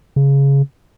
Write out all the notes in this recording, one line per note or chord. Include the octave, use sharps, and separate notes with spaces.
C#3